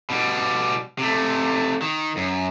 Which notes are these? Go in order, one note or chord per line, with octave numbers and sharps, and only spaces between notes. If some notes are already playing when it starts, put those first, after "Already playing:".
B2 G3
C3 A3
D#3
F#2